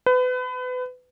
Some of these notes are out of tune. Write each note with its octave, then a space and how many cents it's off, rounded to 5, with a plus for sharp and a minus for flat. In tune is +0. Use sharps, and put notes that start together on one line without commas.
B4 +30